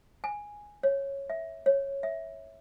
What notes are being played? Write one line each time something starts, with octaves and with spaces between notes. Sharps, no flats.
G#5
C#5
E5
C#5
E5